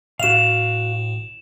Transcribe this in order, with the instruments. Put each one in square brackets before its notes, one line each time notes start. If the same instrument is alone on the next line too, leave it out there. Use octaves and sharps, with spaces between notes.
[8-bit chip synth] A2 [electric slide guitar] F#4 F5 [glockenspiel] E7 F7